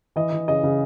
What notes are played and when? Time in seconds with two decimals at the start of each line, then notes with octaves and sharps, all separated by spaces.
0.16 E3 D#5
0.32 E3
0.48 C#3 D#5
0.63 C#3